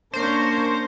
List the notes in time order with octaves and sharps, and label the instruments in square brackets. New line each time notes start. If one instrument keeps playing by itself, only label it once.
[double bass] A#3 D4 [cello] C#4 A#4 [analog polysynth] C5